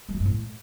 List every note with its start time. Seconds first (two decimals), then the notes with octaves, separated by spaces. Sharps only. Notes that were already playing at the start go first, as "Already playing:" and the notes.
0.09 F#3
0.14 F3
0.20 G2
0.26 A2